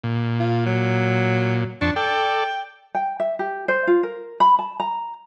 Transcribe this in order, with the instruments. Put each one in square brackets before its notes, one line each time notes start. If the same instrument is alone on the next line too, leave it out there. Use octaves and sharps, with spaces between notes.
[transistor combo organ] A#2
[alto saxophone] F4
F#3
[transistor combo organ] F2 A5 C#6 [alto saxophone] D4
[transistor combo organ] A4 D5 [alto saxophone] G5
[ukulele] G5
E5
G4
C5
F4
A#4
B5
A5
A#5